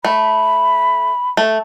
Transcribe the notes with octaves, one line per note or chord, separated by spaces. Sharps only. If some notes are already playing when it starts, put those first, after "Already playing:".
A3 B5
A3